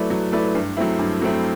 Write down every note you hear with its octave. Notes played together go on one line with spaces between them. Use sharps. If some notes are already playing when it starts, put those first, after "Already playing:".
Already playing: F#3 A3 E4 B4 D5
F#3
A3 E4 B4 D5
G2
F#3 A3 C4 E4
G2
F#3 A3 C4 E4